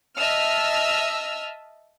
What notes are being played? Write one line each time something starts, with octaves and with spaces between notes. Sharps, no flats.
D#5 E5 A5 E6 F6